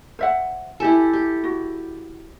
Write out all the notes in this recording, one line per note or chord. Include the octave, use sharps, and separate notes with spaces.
C5 E5 F#5
E4 G4 A4 G#5
G4
F#4